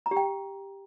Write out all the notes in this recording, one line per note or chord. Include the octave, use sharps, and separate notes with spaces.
A#5
G4
G5